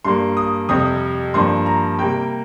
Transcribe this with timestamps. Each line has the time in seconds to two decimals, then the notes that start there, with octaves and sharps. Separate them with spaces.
0.05 G2 G3 A#3 C6
0.37 D#6
0.69 F2 C3 G3 D#6
1.34 G2 F3 A#3 C6
1.66 A#5
1.99 C3 G3 A#3 G5